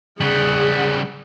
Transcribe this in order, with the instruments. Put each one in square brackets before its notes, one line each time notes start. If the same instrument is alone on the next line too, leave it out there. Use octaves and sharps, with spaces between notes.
[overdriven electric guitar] C#3 G3 [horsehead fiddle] G#4 F#5